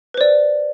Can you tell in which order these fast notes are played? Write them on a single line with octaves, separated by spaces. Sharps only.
B4 C5 D5